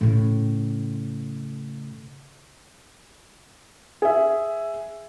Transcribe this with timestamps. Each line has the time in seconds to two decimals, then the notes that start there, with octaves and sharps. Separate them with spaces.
0.01 A2 C#3
4.02 G#4 E5